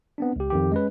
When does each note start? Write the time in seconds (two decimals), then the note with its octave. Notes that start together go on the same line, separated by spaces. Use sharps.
0.18 B3 C4 D4
0.36 C#2 G4
0.50 F2 D#3 G4
0.72 G#3 C#4 B4